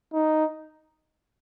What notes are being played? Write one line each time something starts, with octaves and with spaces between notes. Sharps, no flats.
D#4